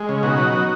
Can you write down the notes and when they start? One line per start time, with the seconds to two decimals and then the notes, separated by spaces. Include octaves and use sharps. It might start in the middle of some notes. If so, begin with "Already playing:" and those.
Already playing: G#3
0.09 C#3
0.23 B2 D#4 F#4
0.38 F#3
0.53 F#3